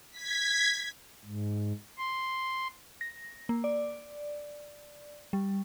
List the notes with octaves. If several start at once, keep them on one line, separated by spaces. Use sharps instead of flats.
G#6 B6
G#2
C6
A#6
A#3
D5
G3